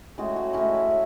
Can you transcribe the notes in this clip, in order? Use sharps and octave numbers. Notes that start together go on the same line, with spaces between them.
A2 G#3 C#4 F#4
F#4
A2 G#3 C#4 E4